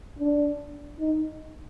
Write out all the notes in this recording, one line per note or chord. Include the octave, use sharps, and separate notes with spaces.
D4
D#4